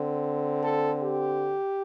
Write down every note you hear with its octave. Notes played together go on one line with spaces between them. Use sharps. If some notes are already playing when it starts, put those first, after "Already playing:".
Already playing: D3 C4
A4
G4